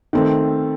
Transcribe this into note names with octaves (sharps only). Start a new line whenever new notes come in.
D#3 A3 C4